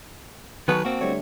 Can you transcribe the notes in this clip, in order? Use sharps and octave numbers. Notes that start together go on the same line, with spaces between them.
D#3 F#3 B4 G#5 A5 C#6
A#3 C4 F#4
D3 G3 A3 C#5